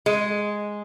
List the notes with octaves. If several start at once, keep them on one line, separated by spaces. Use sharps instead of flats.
G#3